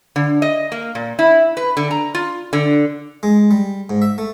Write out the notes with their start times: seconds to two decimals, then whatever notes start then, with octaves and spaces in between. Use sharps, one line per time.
0.16 D3
0.42 D#5
0.72 A#3
0.95 A#2
1.19 E4
1.57 B4
1.77 D3
1.91 A#5
2.15 F4
2.53 D3
3.23 G#3
3.51 G3
3.90 G#2
4.02 E5
4.18 A3